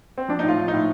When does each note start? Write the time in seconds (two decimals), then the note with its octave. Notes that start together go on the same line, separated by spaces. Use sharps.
0.18 C4
0.28 F3 D4
0.39 A2 D#4
0.48 F4
0.58 F3
0.68 D#4
0.73 A2